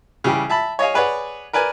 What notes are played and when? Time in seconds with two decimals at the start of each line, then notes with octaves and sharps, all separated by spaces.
0.24 C#3 E3 G3 G4
0.49 E5 A5 B5
0.79 C#5 D#5 F5 G#5
0.94 G#4 B4 C#5 D5 F#5
1.53 A#4 B4 D5 G#5